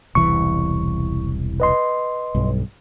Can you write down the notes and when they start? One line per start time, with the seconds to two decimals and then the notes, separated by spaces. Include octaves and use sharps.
0.15 E1 C2 E3 C#6
1.60 B4 D#5 C6
2.35 B1 G2